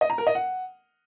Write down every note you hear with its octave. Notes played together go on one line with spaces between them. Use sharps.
D#5
A#5
A#4
D#5
F#5